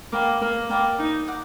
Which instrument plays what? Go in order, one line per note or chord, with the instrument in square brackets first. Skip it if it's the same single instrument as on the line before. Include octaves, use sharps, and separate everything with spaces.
[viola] A#3 [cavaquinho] D5 G5 B5 D6
[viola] A#3
[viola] A#3 [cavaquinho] D5 G5 B5 D6
[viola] D#4
[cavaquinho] D5 F#5 A#5 D6